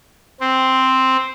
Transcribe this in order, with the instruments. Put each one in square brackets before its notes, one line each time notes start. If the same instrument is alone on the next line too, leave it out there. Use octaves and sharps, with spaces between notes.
[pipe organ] C4